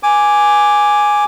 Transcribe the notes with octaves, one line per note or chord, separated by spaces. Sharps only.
G#5 D6